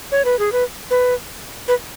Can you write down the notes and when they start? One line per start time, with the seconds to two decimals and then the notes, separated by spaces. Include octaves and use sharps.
0.12 C#5
0.25 B4
0.39 G#4
0.52 B4
0.91 B4
1.68 B4